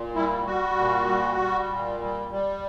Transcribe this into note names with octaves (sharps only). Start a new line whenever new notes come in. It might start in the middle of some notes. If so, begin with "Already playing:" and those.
Already playing: A#2
G3 E4
G3 F#4
A#2
G3
G3
A#2
G3
G3